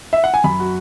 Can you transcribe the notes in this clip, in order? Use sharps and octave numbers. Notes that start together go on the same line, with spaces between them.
E5
F#5
G#5
F#2 B5
F#4